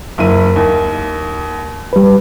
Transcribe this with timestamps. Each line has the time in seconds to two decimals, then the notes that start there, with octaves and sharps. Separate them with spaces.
0.18 F#1 E4 D#7
0.56 D#2
1.93 G3 B4